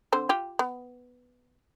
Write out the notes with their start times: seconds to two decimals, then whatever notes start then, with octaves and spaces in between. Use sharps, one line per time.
0.12 D3 C4 C5
0.29 F4 G4
0.59 B3